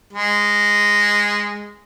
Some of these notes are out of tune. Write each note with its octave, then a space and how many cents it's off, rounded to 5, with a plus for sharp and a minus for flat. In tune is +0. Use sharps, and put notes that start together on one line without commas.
G#3 -10